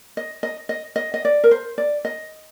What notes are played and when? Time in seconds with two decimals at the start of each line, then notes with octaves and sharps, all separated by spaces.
0.17 D#5
0.43 D#5
0.69 D#5
0.96 D#5
1.14 D#5
1.25 D5
1.44 A#4
1.51 C5
1.78 D5
2.05 D#5